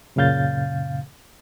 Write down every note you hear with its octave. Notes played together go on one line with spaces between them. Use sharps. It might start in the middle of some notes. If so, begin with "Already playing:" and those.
F#2 A#2 C#3 F5 G6 A6